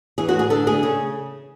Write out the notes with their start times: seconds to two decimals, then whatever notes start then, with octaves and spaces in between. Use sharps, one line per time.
0.18 E3 G#4
0.29 F#4
0.34 A2
0.39 G#4
0.50 D3 A4
0.67 A3 G#4
0.83 C#3